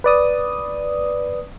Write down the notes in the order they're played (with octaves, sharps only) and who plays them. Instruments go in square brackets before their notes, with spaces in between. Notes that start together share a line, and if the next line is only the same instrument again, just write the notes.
[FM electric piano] B4 D5 D#6